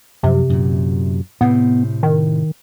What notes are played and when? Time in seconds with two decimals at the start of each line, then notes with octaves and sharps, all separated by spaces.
0.23 F#2 C3 F3
0.50 F#2 A#2
1.41 A2 C3 B3
2.03 D#3